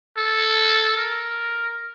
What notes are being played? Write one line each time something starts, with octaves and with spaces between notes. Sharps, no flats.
A4
A#4